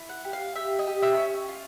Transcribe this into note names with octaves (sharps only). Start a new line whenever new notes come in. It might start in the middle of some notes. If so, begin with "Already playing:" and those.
Already playing: E4
F#5
G4
F5
G4 E5
D#5
G4
E5
C#4
F4